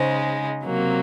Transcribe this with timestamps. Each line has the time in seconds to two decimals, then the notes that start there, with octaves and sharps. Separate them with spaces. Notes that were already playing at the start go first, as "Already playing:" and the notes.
Already playing: C#3 G#3 D#4 C5
0.64 C3 F#3 A#3